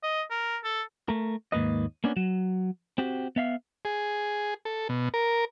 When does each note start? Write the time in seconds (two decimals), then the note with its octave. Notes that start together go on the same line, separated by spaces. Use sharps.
0.03 D#5
0.30 A#4
0.64 A4
1.09 A3 A#4
1.52 D#2 G#2 A#3 B4 D#5
2.04 A#3 B3 C#4 D4
2.16 F#3
2.98 C4 F#4 G4
3.36 B3 E5 F5
3.85 G#4
4.65 A4
4.89 B2
5.14 A#4